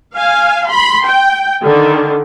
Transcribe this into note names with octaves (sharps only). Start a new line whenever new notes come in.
F5 G#5
B5 C6
G5
D3 D#3